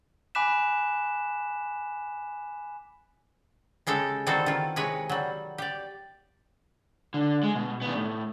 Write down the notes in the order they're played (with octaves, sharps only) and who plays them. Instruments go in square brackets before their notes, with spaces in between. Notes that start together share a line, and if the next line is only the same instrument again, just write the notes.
[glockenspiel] G#5 B5 D6 F#6 B6 E7
[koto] C#3 G#3 G4 A4
D#3 E3 G3 C4 F#4 A4
D#3 E3 F4
C3 G#3 B4 C#5
F#3 G3
G4 D5
[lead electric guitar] D3
G#3
B2
D#3 B3
A2